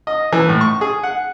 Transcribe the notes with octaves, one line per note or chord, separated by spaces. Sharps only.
D#5
E3
A2
C#6
G#4
F#5